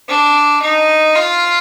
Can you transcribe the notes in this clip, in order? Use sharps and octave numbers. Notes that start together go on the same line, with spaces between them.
D4
D#4
F4